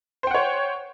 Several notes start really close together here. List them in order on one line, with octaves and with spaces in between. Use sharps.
C5 G5 F#5 C#5